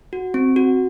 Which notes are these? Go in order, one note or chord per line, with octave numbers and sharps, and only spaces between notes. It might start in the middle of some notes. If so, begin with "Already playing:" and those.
F#4
C4
F#4